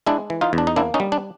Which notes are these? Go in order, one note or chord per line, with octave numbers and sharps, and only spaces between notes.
G#3 D4 E4
E3
D#4 F4
E2
D4
D#4
A#3 D4 E4
C#4 D#4
G3
D4